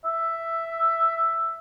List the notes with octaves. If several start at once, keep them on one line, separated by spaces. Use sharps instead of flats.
E5